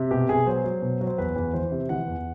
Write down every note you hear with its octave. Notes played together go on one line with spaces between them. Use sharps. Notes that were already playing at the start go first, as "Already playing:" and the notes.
Already playing: C3
B2 G4
B2 G#4
F#3 C5
F#3
B2
F#3
C5
E2 B4
E2
E3 C5
C3
E3 F#5
E2